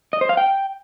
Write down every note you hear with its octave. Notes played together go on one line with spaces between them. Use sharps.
D#5
C5
F5
G5